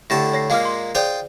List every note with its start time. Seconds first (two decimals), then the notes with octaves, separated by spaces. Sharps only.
0.10 A2 D3 G4 A5 A#6
0.33 C#5 A#6 C7
0.50 A#2 G#3 A#3 F5 D6 F6
0.65 C6
0.95 F4 G#4 C5 D5 G5 D#6